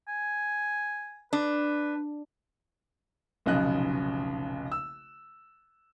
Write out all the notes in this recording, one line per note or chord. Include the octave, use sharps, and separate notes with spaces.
G#5
D4 B4
F1 B1 C#3 D#5 F#6
E6